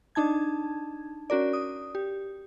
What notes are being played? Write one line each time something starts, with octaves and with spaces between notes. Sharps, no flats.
D4 D#4 A5 G#6
C#4 F#4 A#4 D5
D#6
G4